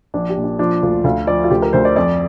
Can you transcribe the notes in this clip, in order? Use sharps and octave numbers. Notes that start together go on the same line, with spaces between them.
A#1 D4
G4
A#2
D4
F3 D4
D2 F4
D2 F5
F3 D5
F4
D2 G4
A#4
D2 C5
D5
F2 D5